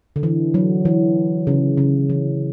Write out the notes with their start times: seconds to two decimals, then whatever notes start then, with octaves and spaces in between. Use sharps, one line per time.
0.16 D3
0.23 E3
0.54 F#3
0.85 E3
1.47 C#3
1.77 C#3
2.10 E3